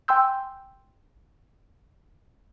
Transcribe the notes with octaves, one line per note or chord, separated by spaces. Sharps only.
G5 G#5 C6 E6 G6